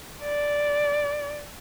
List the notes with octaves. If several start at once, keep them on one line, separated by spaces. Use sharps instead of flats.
D5